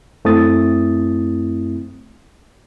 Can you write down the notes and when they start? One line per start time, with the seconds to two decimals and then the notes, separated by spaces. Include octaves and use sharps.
0.25 F#2 A3 C4 E4 D#6 A6